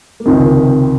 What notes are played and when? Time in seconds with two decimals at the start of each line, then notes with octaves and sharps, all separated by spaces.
0.20 A#3
0.26 C#2 C3 D#3 C4